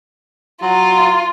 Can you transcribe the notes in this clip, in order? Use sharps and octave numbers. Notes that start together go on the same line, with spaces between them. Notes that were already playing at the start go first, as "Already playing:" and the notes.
F#3 F4